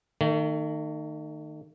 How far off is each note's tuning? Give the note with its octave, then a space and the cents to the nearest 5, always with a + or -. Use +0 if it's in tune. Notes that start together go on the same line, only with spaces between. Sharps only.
D#3 -20 A3 +40